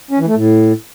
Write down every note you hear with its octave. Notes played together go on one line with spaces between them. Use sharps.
C#4
E3
A3
A2